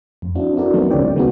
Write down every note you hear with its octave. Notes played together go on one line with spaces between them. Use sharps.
F2
C4 D4 E4 F#4
C4 E4 F#4 A4 A#4 D5
D#3 F3 F#3 B3 C4 D#4
D2 C#3 G#3 C#5 D5 G5
D#3 G#3 B3 C4 D#4 F#4